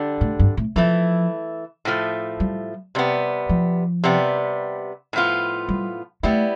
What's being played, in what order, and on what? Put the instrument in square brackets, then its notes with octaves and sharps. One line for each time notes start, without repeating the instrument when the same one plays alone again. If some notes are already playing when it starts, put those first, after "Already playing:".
Already playing: [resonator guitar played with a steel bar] D3 G3 D4
[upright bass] A2
G2
A2
[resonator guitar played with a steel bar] E3 A3 E4 [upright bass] F3
[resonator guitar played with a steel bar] A2 F3 A3
[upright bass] G3
[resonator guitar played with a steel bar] C3 G3 B3
[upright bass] F3
[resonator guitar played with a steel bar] C3 G3 B3
A2 F3 B3 F4
[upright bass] G3
[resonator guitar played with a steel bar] G3 B3 E4 [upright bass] A3